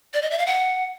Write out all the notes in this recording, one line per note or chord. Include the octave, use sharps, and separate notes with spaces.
D5
D#5
E5
F5
F#5